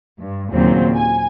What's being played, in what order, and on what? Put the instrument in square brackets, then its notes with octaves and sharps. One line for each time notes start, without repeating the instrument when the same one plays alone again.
[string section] G2
D#2 A#2 C#3 F#3 C4
G#5